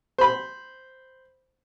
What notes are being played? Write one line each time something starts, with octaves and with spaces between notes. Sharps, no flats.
C5 B5